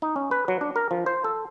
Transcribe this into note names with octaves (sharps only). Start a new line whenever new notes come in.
D#4
C#4
B4
F#3
D4
A#4
F3
C5
A4